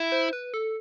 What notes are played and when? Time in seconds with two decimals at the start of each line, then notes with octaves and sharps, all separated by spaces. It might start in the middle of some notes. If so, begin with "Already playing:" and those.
Already playing: E4
0.12 C5
0.33 B4
0.54 A4